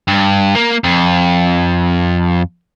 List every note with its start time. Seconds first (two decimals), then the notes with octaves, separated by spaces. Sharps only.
0.08 G2
0.55 A#3
0.84 F2